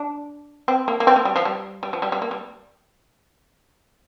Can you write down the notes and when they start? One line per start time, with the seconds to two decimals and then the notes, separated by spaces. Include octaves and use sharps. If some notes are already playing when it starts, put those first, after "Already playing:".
Already playing: D4
0.68 C4
0.88 A#3
1.00 A#3
1.07 C4
1.16 A#3
1.25 G3
1.36 F3
1.45 G3
1.83 G3
1.93 F3
2.02 G3
2.12 G3
2.22 A#3
2.31 G3